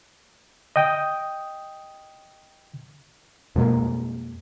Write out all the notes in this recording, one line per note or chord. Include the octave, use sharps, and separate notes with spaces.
D#5 G5 D#6
F2 B2 G#3 A#3